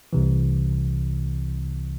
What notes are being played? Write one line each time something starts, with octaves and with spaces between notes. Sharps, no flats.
C2 C3 E3